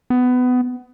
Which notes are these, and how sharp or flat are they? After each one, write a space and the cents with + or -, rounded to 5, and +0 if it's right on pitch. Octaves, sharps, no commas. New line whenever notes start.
B3 +20